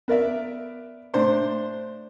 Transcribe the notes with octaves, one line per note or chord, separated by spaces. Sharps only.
B3 A#4 D5 E5
A2 D4 C5 C6